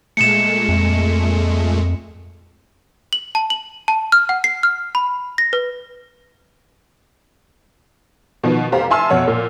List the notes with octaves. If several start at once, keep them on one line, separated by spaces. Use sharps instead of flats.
A#2 G#3 A3 C#7 E7
F2
F#7
A5
F#7
A5
F6
F#5
C7
F6
B5
A#6
B4
B2 D#3 F3 B3
F1 G4 C5 F5 A#5
E5 G#5 A5 C6 E6 F6
F2 B2 C#5 F#5
A#2